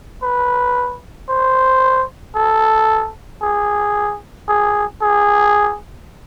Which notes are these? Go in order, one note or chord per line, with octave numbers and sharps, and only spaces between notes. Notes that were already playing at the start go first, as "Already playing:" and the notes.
B4
C5
A4
G#4
G#4
G#4